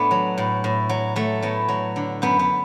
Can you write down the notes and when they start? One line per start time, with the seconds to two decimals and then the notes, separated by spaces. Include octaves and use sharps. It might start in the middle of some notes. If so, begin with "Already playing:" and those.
Already playing: A2 A3 B3 D4 E4
0.11 F#3
0.38 A2
0.64 A2
0.89 F#3
1.16 F#3 A3
1.42 A2 B3
1.69 F#3
1.96 D3
2.22 F#2 B3
2.39 B3